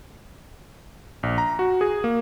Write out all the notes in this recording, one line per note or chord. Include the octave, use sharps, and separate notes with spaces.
A#1
A#5
F#4
G#4
A#3